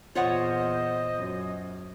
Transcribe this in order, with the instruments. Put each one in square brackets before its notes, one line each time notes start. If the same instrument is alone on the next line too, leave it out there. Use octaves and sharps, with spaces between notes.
[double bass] E2 A#2 [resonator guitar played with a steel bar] F4 C#5 F#5 [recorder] C5 [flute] D#5
[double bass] F#2